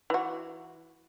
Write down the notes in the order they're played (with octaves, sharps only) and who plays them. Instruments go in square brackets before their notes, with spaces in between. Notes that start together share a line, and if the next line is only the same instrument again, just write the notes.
[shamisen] E3 F#4